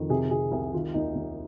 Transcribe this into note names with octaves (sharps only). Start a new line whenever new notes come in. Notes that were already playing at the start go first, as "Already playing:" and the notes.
Already playing: F2 D#3
C3 G#4
C3 G#4
C2 G#4
D#3 F4
D#2 D#4
D#2